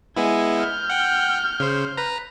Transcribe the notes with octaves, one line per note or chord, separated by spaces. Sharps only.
G#3 B3 E4 G#5
F6 G6
F#5 G5
C#3 C5
B4 A#5